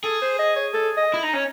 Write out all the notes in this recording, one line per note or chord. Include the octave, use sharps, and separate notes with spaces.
G#4 A4
C5
D#5
C#5
A4
D#5
E4
D#4
C#4